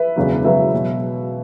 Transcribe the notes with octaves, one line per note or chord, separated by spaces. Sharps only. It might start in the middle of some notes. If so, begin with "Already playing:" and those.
Already playing: B4 E5
E1 E2 C#3 F#3
E1 E2 C#3 F#3 B4 E5
B2 F#3